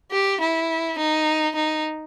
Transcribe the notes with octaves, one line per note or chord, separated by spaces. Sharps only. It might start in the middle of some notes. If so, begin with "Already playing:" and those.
G4
E4
D#4
D#4